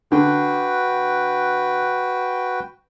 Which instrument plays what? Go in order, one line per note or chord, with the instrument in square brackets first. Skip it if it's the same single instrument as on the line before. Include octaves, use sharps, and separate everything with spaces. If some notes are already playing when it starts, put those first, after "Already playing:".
[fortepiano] D3 [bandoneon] F#4 B4 G5